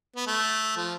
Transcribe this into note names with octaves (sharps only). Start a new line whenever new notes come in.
B3
A3
F3